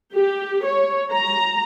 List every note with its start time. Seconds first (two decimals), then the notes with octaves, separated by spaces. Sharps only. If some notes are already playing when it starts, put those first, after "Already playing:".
0.15 G4
0.65 C#5
1.12 A#5